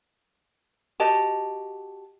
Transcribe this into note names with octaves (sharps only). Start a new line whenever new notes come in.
F#4 G4 D#5 A5